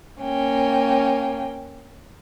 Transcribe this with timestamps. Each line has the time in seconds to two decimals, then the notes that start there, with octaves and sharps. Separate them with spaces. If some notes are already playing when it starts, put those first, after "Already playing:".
0.19 A#3 C#4 G5